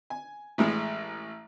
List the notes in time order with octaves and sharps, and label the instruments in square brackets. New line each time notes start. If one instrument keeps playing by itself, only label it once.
[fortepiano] G#5
A1 A2 G#3